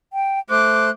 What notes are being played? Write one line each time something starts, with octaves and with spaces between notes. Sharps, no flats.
G5
A3 C5 D6 F#6